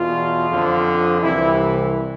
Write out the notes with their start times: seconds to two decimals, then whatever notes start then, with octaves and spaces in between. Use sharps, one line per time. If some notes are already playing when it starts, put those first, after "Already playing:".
Already playing: E2 B2 F4
0.50 F2 D3 F3
1.22 C2 C3 E3 E4